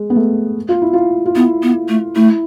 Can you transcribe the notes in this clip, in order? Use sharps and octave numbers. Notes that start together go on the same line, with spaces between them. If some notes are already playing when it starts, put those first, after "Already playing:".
Already playing: G#3
B3
A3
F4
E4
F4
F4
B3 E4
B3
A3
A3 E4